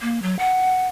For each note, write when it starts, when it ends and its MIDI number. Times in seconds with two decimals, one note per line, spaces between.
0.01 0.19 58
0.22 0.35 54
0.39 0.88 78